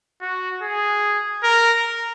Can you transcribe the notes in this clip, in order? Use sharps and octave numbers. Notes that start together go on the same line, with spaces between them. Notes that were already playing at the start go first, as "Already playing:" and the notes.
F#4
G#4
A#4